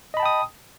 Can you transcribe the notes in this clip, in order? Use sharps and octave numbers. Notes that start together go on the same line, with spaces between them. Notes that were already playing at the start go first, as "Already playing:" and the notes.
D#5 G5 A5 B5 D#6